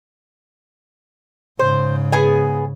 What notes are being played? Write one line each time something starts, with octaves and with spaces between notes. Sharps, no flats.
G#2 C#3 C5
B3 G#4 G#5